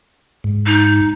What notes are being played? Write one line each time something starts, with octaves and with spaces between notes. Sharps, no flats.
G#2
D#4